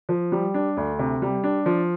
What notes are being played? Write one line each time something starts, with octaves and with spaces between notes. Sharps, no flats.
F3
G3
D4
D2
C3
G3
D4
F3